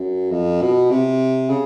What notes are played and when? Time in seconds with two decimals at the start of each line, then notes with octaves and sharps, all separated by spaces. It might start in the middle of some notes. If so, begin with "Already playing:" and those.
Already playing: F#2
0.31 F2
0.61 B2
0.90 C3
1.50 C#3